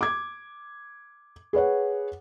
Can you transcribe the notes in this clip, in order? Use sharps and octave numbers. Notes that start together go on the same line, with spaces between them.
D6 G#6
G#4 B4 C#5 F#5